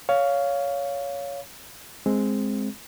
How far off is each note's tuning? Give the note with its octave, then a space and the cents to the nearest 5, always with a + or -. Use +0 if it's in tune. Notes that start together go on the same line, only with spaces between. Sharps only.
C#5 +15 F5 +0
G#3 +0 C4 +0